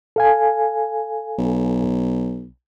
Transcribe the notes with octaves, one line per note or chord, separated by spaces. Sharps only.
A4 F5 G#5
B1